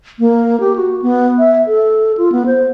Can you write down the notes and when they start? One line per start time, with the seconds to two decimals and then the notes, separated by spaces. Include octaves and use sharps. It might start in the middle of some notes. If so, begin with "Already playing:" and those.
0.19 A#3
0.60 G4
0.76 F#4
1.02 B3
1.39 E5
1.67 A4
2.18 F4
2.32 B3
2.46 C5